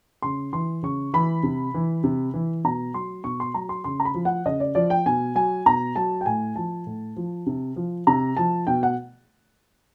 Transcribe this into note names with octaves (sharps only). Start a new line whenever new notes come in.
C#3 C6
E3 C6
C#3 C#6
E3 B5
C3
E3
C3
E3
B2 A#5
F#3 C6
B2 C#6
C6
F#3 A#5
C6
C#3 C6
A#5
B5
F3
F#5
C#3 D#5
D5
F3 D5
G5
B2 G#5
F#3 G#5
B2 A#5
F#3 A5
G5
A2 G#5
F3 A5
A2
F3
C3
F3
C3 A#5
F3 A5
B2 G5
F#5